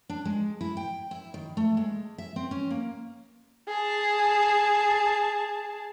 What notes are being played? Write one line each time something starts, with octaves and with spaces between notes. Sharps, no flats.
D4
G#3
E4
G5
E4
D#3
A3
G#3
E5
C4
C#4
A#3
G#4 A5